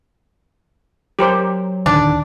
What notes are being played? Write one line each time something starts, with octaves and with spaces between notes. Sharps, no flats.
F#3 G4 A#4 C5
D1 D3 D#3 D4